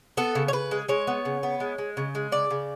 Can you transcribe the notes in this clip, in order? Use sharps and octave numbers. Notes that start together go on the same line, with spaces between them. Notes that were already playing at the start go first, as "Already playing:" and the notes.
B3 A4
C#3
C#5
C#3 B4
G#3
G#3 C#5
B3
C#3
B3
G#3
G#3
C#3
G#3
C#3 D5
C#3